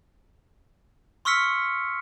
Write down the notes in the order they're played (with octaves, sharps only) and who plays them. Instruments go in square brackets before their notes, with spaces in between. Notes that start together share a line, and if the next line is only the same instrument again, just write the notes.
[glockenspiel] C6 C#6 E6 F6 B6 C#7